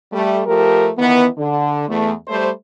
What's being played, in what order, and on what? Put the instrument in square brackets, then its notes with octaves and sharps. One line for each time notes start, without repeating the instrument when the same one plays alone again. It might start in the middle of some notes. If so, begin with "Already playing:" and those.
[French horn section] G3 A3
F3 A3 G4 A#4
D#3 E3 B3
D3
E2 A3
G3 A3 C5